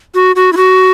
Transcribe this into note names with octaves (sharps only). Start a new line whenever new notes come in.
F#4
F#4
E4
F#4